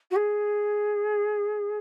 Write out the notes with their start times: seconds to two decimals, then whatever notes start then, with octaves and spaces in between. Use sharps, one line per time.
0.11 F#4
0.16 G#4